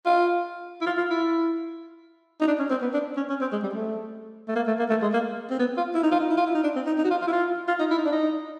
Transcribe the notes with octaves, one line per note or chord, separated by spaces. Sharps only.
F4
E4
F4
F4
E4
D#4
D4
C#4
C4
B3
D4
C#4
C#4
C4
G#3
G3
A3
A3
A#3
A3
A#3
A3
G#3
A#3
C4
B3
F4
E4
D#4
F4
D#4
E4
F4
E4
D#4
D4
C4
D#4
D#4
F#4
F4
F4
E4
F4
F4
D#4
E4
D#4
D4
D#4